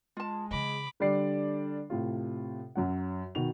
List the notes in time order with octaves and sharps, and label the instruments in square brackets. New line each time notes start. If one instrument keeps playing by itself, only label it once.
[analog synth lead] G#3 [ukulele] F4 A5
[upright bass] C#3 E3 [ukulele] D#5 [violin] B5 D6
[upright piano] D3 G3 D4 D5 C7
A2 C3 F4
F#2 F#3 F#5
B2 D#3 F#4 F7